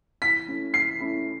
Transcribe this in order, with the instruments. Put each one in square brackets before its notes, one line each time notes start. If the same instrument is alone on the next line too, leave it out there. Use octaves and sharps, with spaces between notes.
[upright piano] E3 [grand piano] B6
[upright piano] A3 C#4 E4
[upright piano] E3 [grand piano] C7
[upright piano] A3 C#4 E4